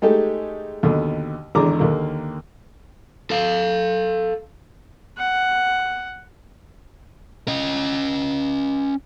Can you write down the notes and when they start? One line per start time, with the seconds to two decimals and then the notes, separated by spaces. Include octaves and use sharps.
0.02 G#3 A3 D#4 G4 A4
0.83 D#2 B2 D3
1.55 G#1 E2 D3 D4 A#5 D6
1.79 D#2 D3 A#3
3.30 A4 F5
5.18 F#5
7.48 C#4 D#5